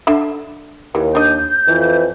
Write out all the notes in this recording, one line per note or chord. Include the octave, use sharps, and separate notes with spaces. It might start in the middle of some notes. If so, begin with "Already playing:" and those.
D3 D4 E5
D#2 E3
D4 D#5 G6
F2 E3